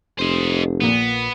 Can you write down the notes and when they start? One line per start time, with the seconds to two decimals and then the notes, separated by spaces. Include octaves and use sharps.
0.19 F1 C5 D#5
0.81 A#1 A#2 B3